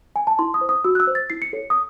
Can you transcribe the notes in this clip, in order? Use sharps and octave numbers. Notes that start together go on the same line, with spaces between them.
G#5
A5
E4 C6
D#6
C5
D#6
F#4 E6
F#6
E6
C5
A6
E4 C7
C#7
A4 C#5
D#6